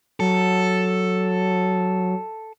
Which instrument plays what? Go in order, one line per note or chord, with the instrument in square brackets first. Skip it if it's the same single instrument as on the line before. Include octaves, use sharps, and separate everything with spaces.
[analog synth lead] F#3 [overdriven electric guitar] A4